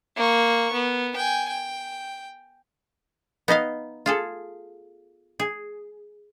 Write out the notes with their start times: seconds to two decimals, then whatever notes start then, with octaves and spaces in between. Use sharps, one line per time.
0.16 A#3 C#6
0.73 B3
1.16 G5 G#5
1.49 G5
3.48 B3 D#4 D#5 F5
4.06 F4 G#4 A4
5.40 G#4